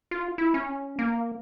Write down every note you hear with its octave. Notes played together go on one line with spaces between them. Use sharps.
F4
E4
C#4
A#3